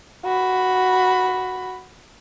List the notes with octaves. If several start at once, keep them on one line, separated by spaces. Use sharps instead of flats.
F#4 B5